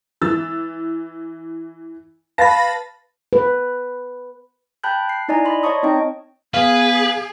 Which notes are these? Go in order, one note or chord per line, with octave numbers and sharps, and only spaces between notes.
E3 E6 A6
B4 F5 A5 B5 A6 A#6
B4
G5 A5 B5 F#6 G6
C7
D#4 E4 D5 D#5 G#5 A#5
D5 D#5 B5 C6
C#5 D#5 A5 C#6 D#6
C4 D#4 C#5 D#5 G5
B3 G#4 B4 F5